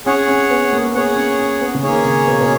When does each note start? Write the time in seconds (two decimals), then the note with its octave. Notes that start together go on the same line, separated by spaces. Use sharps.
0.06 C#4 G#4 C#5 F#5
0.28 C#4
0.50 B3
0.73 A#3
0.95 B3 G#4 C#5 F#5
1.16 C#4
1.39 C#4
1.61 B3
1.74 C#3
1.83 D#3 A#3 C#4 G#4 C#5
2.05 C#3
2.27 B2
2.41 B2